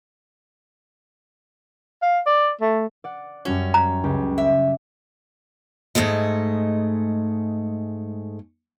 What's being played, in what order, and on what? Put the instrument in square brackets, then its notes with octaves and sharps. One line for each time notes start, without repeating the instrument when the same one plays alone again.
[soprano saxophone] F5
D5
A3
[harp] D5 F#5
[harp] F#2 G3 F#4 [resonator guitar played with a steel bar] C#4
[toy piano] A#5
[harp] C#2 G4
[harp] D5 [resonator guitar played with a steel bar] E5
[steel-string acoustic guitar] G#2 D3 G#3 A3 D#5